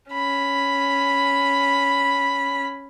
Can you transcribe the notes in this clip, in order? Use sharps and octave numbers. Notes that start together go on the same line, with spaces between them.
C#4 B5